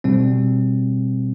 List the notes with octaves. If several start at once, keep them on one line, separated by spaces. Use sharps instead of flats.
B2 G3 C4